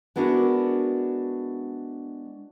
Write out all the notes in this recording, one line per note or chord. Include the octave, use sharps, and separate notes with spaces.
G#3 B3 D4 E4 F#4 A#4